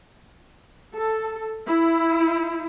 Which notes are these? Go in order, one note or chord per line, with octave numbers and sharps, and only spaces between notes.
A4
E4